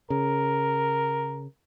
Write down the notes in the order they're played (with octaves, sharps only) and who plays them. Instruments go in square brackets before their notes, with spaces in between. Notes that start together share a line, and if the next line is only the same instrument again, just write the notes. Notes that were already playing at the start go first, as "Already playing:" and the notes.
[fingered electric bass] C#3 [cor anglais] A#4